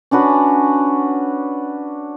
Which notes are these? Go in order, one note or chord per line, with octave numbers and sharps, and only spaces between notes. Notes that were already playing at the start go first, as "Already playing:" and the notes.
C#4 D4 F#4 B4